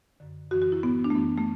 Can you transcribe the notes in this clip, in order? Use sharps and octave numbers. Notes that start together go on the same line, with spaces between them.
F#2 D3
F#2 E3 F#4
F#4
E4
A2 E3 B3
D4
A3
F#2 E3 B3
A3